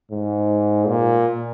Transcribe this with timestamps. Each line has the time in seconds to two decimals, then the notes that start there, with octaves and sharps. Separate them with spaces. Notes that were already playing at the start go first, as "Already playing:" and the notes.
0.11 G#2
0.87 A#2